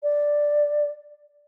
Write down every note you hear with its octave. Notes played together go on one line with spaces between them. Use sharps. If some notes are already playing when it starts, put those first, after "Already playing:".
D5